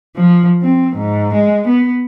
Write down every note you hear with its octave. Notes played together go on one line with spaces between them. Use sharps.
F3
C4
G#2
G#3
B3